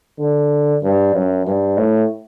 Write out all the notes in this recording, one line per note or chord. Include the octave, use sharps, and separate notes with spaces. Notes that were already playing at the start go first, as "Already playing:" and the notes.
D3
G2
F#2
G2
A2